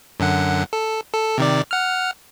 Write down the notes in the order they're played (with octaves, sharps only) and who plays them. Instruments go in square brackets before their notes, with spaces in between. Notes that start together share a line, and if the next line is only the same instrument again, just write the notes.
[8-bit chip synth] F#2 D3 F#5
A4
A4
C3 D#3 D5
F#5 F6